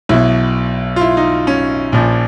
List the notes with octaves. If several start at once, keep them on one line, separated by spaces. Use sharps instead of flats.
B1 B2 E4
F4
E4
D#4
C#4
A#1 A#2 F3